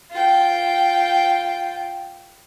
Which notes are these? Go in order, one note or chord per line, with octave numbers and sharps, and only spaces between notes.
F4 G5